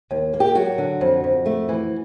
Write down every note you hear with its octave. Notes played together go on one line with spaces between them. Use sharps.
D#2
A#3
G4
F#3 F#4
D3
F2
F2
A3
E3